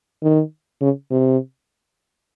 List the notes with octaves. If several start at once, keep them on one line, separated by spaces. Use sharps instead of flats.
D#3
C#3
C3